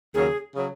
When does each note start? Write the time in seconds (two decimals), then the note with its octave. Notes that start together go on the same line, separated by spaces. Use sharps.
0.14 D#2 C#3 F#3 G#4
0.55 C#3 F#3